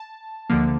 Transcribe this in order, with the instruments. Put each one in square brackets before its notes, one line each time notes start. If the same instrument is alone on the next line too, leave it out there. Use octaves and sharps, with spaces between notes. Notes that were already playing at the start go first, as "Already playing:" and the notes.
Already playing: [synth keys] A5
D2 D3 F3 A#3